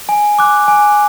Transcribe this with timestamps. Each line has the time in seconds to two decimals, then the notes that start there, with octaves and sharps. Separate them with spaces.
0.09 G#5
0.39 D6 F#6
0.68 G#5